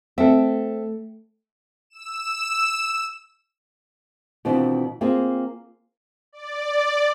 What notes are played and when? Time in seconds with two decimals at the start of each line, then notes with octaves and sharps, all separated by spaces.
0.18 A3 C4 A4 E5
1.90 E6 E7
4.45 B2 D#3 E3 C4 D4 F4
5.01 A#3 C4 F4 G#4
6.32 D5